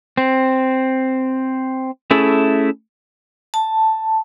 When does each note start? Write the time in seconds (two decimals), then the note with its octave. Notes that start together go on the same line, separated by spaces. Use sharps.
0.17 C4
2.11 A3 C#4 E4 G#4 A4
3.54 A5